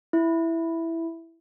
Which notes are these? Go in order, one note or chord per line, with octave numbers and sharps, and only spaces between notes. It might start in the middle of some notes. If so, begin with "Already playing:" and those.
E4